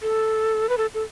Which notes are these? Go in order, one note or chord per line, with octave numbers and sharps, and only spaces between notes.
A4
B4
A4
A4